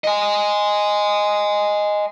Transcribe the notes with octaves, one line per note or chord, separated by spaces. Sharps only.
D#5 G#5